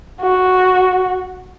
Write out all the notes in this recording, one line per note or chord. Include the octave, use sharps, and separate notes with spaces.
F#4